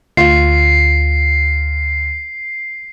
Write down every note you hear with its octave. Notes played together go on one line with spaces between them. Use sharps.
D2 F4 C7